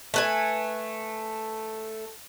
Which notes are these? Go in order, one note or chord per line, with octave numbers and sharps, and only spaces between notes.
A3 B4 G#5